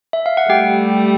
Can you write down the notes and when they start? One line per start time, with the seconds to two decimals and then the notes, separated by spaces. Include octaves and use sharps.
0.13 E5
0.26 F5
0.37 F#5
0.49 G3 A3 G4 G5